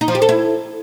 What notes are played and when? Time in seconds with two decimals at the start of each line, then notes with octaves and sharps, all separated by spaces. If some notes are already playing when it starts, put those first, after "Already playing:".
0.01 D#4
0.08 F3
0.15 G4
0.22 A4
0.29 E4